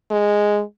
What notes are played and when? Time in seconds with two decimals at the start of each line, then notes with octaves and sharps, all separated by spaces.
0.11 G#3